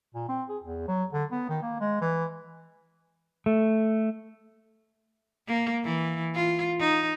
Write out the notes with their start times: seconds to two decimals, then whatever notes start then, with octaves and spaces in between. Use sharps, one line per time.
0.15 A#2
0.29 C4
0.49 G#4
0.63 E2
0.88 F#3
1.13 D3
1.32 B3
1.49 D#3
1.62 A#3
1.80 G#3
2.01 E3
3.46 A3
5.48 A#3
5.85 E3
6.35 F4
6.80 D#4